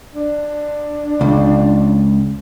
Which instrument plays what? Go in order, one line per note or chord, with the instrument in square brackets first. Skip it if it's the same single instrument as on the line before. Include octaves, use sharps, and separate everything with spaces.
[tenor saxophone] D4
[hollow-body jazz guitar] C#2